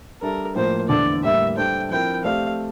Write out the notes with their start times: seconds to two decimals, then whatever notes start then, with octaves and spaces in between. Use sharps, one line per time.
0.21 G3 D4 A4 A#4 E5
0.55 A2 F3 A#3 C5
0.89 E2 D3 A3 D4 A4 D5
1.23 A2 G3 A#3 E5
1.57 G3 D4 A4 C5 G5
1.91 F3 C4 E4 A#4 G5
2.24 A3 C4 G4 D5 F5